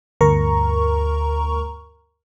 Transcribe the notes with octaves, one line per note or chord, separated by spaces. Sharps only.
D2 G2 A#4 A#5 C#6